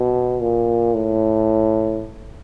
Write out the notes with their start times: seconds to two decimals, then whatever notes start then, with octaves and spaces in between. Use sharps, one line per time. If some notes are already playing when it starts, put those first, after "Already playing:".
Already playing: B2
0.40 A#2
0.94 A2